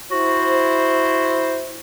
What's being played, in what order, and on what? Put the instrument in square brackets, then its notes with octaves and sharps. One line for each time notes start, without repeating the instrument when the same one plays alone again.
[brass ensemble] E4 C5 [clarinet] F#4